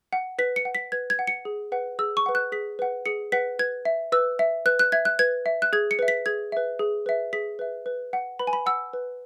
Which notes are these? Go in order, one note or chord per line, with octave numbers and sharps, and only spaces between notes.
F#5
B4 B6
C#7
F#5
B6
B4 G#6
G#6
F#5
C#7
G#4
B4 F#5
G#4 E6
C#6
B4 F#5
F#6
G#4 B6
B4 F#5
G#4 C#7
B4 F#5 B6
B4 G#6
E5
B4 E6
E5
B4 F#6
F#6
E5 G#6
F#6
B4 G#6
E5
F#6
G#4 G#6
C#7
B4 E5
B6
G#4 G#6
B4 E5
G#4
B4 E5
G#4 B6
B4 E5
B4
F#5
B4 B5
G#5
B5
F#5 E6
B4